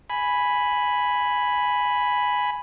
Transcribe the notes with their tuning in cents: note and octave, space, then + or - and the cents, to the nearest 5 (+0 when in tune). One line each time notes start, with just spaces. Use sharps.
G#5 +0 B5 +0